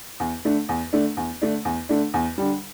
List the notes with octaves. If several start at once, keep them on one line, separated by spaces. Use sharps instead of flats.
E2
D3 A3 D4
E2
D3 A3 D4
E2
D3 A3 D4
E2
D3 A3 D4
E2
D3 G3